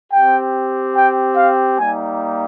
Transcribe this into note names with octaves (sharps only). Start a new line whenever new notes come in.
C4 G4 G5
G5
F5
G3 A#3 D#4 G#5